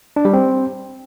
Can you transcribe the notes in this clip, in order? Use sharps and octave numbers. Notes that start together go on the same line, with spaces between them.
D4
G3
C4